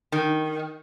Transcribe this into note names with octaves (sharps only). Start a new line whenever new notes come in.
D#3